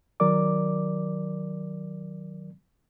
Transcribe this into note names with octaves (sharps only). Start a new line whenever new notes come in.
D#3 F#3 A#4 D5 D6